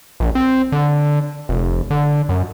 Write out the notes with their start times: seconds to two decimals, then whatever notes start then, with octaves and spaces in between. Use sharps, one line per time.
0.20 A#1
0.35 C4
0.72 D3
1.49 F1
1.90 D3
2.29 F#2